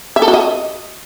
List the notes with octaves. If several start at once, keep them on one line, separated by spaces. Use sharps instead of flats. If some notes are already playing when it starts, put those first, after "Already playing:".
E5
A4
F#4
D#5